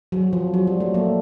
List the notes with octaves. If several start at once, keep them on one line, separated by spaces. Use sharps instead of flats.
F#3
F3
F#3
G3
A3
A#3